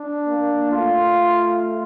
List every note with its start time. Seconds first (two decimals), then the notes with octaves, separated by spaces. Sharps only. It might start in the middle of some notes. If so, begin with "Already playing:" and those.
Already playing: D4
0.27 A#3
0.72 A3 F4